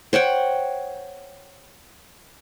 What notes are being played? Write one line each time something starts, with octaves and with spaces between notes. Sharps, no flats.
C5 C#5 F#5 G5